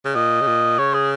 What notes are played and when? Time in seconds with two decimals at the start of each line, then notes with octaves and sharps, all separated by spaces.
0.05 C#3
0.15 A#2 D#5
0.41 C#3
0.47 A#2
0.79 C#3 C#5
0.94 G#4